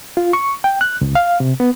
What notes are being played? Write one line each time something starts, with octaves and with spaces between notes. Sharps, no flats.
F4
C#6
G5
F#6
C#2
F5
C3
B3